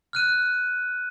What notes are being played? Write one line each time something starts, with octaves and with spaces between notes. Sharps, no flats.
F6 F#6 D#7